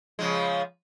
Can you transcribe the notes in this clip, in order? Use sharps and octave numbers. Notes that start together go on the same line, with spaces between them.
C#3 F3 G#3